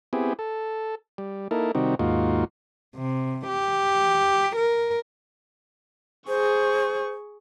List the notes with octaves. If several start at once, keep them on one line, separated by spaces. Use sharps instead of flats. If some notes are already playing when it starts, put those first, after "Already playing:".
B3 C4 E4 G4 G#4
A4
G3
A#3 D#4 E4 A4 A#4
C3 D#3 G3 C4 D#4 F#4
D#2 G#2 A#3 D#4 F4 F#4
C3
G4
A#4
G#4 C5 C#6